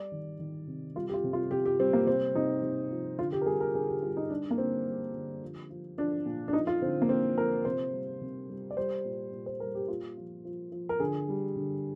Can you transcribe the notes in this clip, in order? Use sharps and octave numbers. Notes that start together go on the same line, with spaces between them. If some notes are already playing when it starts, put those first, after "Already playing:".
Already playing: G3 D5
D#3
D#3
C3
G3 F4
G4
F4
C3
F4
C3 G4
G4
G3 C4
A#3
C3 C4
C3 D#4
C3
F3
D3 F4
G4
A#4
G3 G#4
A#4
D3 G#4
G4
G3 F4
D#4
G3 D4
A#3
D3 C4
G3
D3
F3
F3
F3 D4
A#2
D4
F3 D#4
F4
D3 C4
A#3
F3 C4
F3 A#4
C3 C5
G3
C3
G3
D5
G3 C5
A#2
A#2
C5
G3 A#4
G4
A#2 F4
F3
F3
F3
A#4
D3 G#4
G3
D3